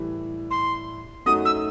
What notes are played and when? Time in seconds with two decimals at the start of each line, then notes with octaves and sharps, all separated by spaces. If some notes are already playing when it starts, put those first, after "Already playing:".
Already playing: A2 E3 G3
0.51 C6
1.26 F#2 F#3 A3 D#4 F#4 D#6
1.45 E6